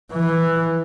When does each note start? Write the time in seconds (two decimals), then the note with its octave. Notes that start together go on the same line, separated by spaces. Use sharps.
0.12 E3